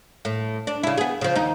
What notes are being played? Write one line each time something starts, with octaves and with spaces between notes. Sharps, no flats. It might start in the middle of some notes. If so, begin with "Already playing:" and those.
A2
D4
C#3 E4
B3 G#4
C#3 F3
D#2 D#4